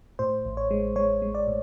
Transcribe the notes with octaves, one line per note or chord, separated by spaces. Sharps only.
A2 C5
A1
C#5
G#3
G#3 C#5
G#3
D5
A2